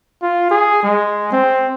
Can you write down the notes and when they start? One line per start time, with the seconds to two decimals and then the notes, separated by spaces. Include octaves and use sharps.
0.23 F4
0.51 G#4
0.83 G#3
1.33 C4